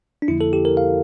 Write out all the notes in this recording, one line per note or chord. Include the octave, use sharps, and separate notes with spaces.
D4
F2 D3 F3 A#3 E4
A4
G4
A#4
F5